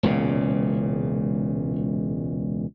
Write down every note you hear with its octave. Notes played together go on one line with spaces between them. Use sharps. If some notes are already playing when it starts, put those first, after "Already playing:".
E1 C#2 A#2 C#3